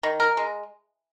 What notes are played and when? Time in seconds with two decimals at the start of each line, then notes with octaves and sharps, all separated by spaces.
0.03 D#3
0.20 A#4
0.37 G#3